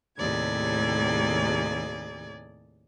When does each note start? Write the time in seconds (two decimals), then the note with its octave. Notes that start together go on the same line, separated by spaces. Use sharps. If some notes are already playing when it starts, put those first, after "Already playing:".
0.18 D#2 A2 C3 G#4 D5 G#6